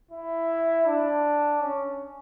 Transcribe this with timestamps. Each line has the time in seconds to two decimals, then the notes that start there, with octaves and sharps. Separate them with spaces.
0.11 E4
0.87 D4
1.61 C#4